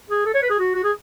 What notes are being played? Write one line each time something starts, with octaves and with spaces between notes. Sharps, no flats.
G#4
A4
C#5
B4
G#4
F#4
F#4
G#4